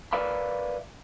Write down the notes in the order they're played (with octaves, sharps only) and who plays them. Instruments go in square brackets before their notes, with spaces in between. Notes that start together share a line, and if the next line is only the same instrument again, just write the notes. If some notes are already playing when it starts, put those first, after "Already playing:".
[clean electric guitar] A#4 B4 D5 E5 F5 B5